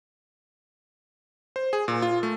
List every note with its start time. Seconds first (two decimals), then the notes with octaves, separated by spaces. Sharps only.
1.56 C5
1.73 G#4
1.88 A#2
2.02 F4
2.23 A3